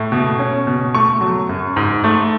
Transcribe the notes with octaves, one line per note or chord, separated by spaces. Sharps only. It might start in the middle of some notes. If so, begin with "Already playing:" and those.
Already playing: A2
B2
C#4
B2
A3 C#6
F#3
F#2
G#2
A3